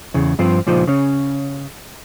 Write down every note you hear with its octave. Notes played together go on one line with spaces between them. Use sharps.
E2 C#3
G2 F3 C4
C#2 A#2 F3 D#4 C5
C#3 C#4